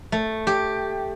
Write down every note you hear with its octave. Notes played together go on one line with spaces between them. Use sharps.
A3
G4